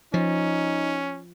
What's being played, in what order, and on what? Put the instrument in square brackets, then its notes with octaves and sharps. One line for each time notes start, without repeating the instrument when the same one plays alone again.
[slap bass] F3 [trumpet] C#4 [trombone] D#4